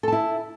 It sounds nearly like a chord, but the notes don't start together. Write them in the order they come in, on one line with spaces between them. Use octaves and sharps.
A4 A5 E4